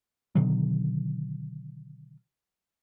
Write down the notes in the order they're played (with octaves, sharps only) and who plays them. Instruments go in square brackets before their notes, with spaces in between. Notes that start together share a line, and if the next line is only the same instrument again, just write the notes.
[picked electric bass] B2 D3 D#3 F#3